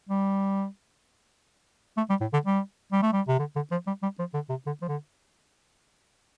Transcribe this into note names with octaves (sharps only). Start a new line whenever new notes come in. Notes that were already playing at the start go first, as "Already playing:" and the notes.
G3
A3
G3
A2
D3
G3
G3
A3
G3
C3
D3
D3
F3
G3
G3
F3
D3
C3
D3
F3
D3